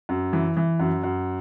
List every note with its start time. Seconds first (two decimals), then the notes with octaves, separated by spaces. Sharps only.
0.09 F#2
0.33 E3
0.57 E3
0.80 F#2
1.03 F#2